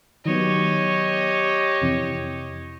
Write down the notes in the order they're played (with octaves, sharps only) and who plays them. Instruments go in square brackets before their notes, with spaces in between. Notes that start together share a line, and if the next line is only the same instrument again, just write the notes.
[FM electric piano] D#3 F#3 B3 [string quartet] G4 C#5 D#5
[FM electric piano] F2 C3 E3